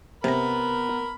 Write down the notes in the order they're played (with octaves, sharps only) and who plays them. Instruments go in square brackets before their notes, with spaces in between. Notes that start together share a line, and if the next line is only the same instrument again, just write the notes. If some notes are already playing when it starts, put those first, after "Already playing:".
[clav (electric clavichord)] C3 A#5 [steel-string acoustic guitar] B3 [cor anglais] A#4 [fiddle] B5